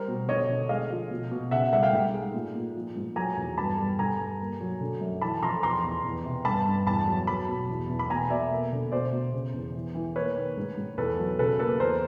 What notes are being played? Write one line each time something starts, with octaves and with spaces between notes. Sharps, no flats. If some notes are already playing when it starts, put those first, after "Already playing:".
Already playing: G3 A#4 C5
B2
D3 C#5 D#5
D3
G#3 D#5 F5
F3
B2
B2
C#3 E5 F#5
G3 E5 F#5
F5 G5
G#2
G#3
A#2
A#2
F3
G#2
F#3 G#5 A#5
E2
G2 A5 B5
G3
D3 G#5 A#5
G2
A#3
F#3
D3
F#2
E3 A5 B5
F2 A#5 C6
E2 A#5 C6
E2
E2
C3
G2 A5 B5
G2
E2 A5 B5
F#3
F#3 A5 B5
B2
E2
E2
B5
B2 G#5 A#5
B2 D5 E5
A#3
D3
B2 C5 D5
B2
C#3
E2
E3
E3
A#3 B4 C#5
D#3
G#2
G#2
E2 A4 B4
F#3
C#3 A4 B4
A#3 A4 B4
E2 A#4 C5